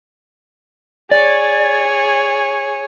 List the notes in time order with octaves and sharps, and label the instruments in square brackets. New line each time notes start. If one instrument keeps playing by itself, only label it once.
[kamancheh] G#4 C#5 [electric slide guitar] D5